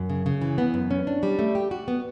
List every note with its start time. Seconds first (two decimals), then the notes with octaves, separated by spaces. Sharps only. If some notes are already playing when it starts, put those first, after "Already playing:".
Already playing: F#2
0.10 C#3
0.26 C#3
0.41 E3
0.58 B3
0.74 F#2
0.91 C#4
1.07 D4
1.23 G3
1.39 A3
1.55 G4
1.71 F#4
1.88 B3